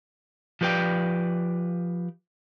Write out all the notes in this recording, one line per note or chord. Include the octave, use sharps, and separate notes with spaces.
F3 G4 B4 D5 G5